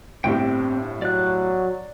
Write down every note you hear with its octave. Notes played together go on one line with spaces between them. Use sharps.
G1 A2 C4 D4 G4 G5
F#3 D5 F#6